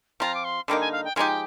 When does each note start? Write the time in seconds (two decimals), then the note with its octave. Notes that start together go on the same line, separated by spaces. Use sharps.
0.20 F3 C4 F4 A#5
0.35 D6
0.44 C6
0.68 D3 G3 A#3 D#4 D6
0.80 G#5
0.92 F5
1.05 G5
1.16 F3 G#3 D#4 G4 G#5
1.28 G5